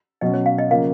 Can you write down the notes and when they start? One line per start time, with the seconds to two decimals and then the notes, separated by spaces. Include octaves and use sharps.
0.21 B2 F#3 C#4 D#5
0.34 C#5
0.46 F5
0.58 D#5
0.71 C#3 F3 A#3 F5